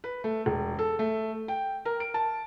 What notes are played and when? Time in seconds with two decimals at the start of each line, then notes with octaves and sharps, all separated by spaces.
0.04 B4
0.24 A3
0.46 E1
0.79 A4
0.99 A3
1.48 G5
1.85 A#4
2.00 D7
2.14 A5